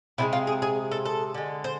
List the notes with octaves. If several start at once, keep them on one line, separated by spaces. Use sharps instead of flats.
C3 F3 G#3 E4
F4
G#4
G#4
A4
A4
D3 G#3
C5